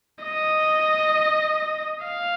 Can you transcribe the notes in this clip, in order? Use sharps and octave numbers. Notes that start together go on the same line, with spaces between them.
D#5
F5